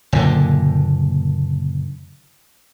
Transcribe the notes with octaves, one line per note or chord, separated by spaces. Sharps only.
F#1 A#2 D3